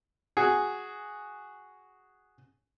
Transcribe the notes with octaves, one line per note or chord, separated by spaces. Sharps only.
F#4 G#4